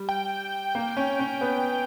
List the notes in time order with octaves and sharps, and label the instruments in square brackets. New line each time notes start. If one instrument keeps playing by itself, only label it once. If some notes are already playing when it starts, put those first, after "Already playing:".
Already playing: [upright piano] G3
[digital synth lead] G5
[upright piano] A#3
C#4
C#4
B3